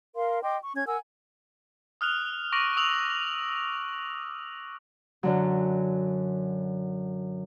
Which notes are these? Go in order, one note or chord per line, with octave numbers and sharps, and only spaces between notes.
A#4 F5 C6
D#5 G5 C6 D6
C#6
C#4 G#6
A#4 F#5 G#5 E6
D#6 F6 F#6 F7
C#6 D6 A#6 D7 F7 F#7
C#6 D#6 E6 F7 F#7
F#2 D3 F#3